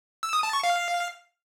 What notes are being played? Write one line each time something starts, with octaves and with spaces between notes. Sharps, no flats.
E6
D#6
A5
C#6
F5